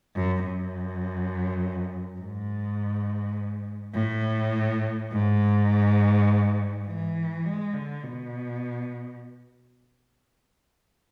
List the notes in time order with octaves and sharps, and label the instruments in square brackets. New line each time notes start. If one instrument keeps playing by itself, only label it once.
[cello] F#2
F#2
G#2
A2
G#2
E3
G#3
D3
B2